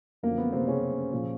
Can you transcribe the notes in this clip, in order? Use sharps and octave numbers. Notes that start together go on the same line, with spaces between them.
F#2 D3 F3 A#3
B3
C3 C4
C#3 C#4
A#2 F3